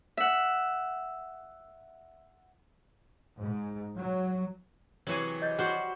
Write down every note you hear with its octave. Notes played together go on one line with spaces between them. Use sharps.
E5 F#5
G#2
F#3
C3 E3 F#3 F#4 G#4
D#5 G6 A6
G3 F#4 C5